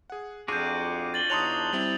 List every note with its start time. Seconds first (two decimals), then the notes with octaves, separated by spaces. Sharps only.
0.10 G#4 F#5
0.48 F2 D4 F4 F#4 G#4 D6 G6 D#7
1.14 A6 F#7 G7
1.30 E2 D#4 C#5 A5 C6 D#6 F#6 F7
1.73 G3 C4 E4